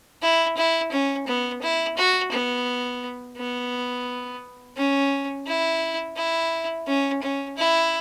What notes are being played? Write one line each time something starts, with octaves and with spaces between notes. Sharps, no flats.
E4
E4
C#4
B3
E4
F#4
B3
B3
C#4
E4
E4
C#4
C#4
E4